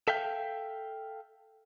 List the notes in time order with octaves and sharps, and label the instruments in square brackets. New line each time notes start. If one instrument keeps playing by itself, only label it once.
[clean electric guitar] A4 E5 F5 G5